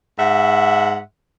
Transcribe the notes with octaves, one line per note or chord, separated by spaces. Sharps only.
G#2 E5 F#5